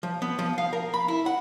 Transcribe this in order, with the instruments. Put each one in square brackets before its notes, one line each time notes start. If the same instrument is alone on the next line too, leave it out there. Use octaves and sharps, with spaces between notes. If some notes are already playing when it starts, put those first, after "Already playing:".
[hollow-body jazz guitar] F3
B3
F3
F5
A#4
B5
E4
F#5